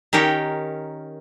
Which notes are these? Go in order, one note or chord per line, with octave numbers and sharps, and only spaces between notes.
D#3 C#4 G4 A#4 G5